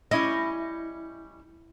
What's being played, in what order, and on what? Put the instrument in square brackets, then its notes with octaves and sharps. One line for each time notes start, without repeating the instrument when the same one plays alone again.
[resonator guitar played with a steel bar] G3 C#4 D#5 [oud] E4